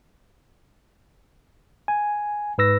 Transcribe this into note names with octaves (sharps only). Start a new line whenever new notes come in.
G#5
G#2 B4 E6 A#6